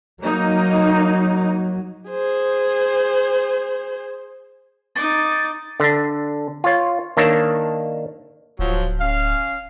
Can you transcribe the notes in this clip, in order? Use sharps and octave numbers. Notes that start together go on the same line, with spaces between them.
F#3 A#3 D#4
G#4 C5
D#4 D6 A6
D3 D4
F4 C#5
D#3 A#3 D4 C#5 E5
D1 F3 F#3
C#4 F5